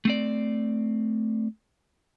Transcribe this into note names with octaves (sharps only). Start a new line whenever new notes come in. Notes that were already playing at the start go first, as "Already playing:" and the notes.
A3 C4 D5